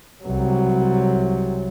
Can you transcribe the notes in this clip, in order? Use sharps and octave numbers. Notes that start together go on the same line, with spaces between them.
C2 F#3